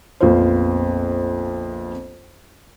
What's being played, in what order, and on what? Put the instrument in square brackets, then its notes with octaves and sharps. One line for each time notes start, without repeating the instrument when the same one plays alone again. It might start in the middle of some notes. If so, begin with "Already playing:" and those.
[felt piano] A#1 F2 B3 F4 C5